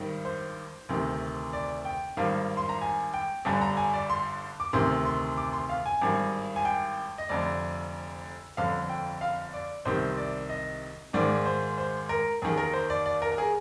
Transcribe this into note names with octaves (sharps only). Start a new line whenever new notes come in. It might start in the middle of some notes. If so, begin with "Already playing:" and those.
Already playing: G#1 G2 D#3
C5
D2 C3 D#3
D5
G5
G#1 G2 D#3 F5
C6
A#5
G#5
G5
G1 G2 D3 G#5
A#5
G#5
D5
C6
D6
D2 C3 D#3 C6
C6
D6
C6
F5
G#5
G#1 G2 D#3
G#5
G5
D#5
F1 F2 D3 D5
G1 F2 D3 F5
G5
F5
D5
C2 C3 D#3 C5
D5
D#5
G#1 G#2 D#3 D5
C5
C5
A#4
D#2 D#3 G#4
A#4
C5
D5
D5
A#4
A#4
G#4